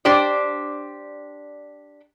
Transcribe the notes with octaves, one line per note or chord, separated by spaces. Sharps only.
D4 G4 C5 D5